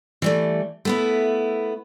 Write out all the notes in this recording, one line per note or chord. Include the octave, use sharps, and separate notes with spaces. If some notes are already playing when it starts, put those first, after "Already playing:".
E3 G3 A3
A3 B3 E4